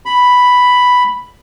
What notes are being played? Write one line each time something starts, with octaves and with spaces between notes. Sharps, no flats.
B5